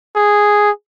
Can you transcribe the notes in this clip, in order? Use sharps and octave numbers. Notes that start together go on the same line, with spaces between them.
G#4